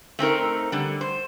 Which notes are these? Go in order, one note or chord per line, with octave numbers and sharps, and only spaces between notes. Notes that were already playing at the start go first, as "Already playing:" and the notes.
A3 C4 D#4 A#4
D3 G3
C5